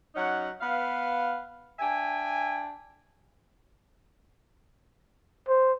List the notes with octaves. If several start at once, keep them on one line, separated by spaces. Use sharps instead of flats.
F#3 C#4 D#4 F#5
B3 B4 F5
D4 E5 G5 G#5
C5